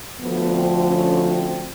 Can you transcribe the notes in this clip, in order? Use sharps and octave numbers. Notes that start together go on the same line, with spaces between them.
D2 D3 F3 B3
C4
C#4
C4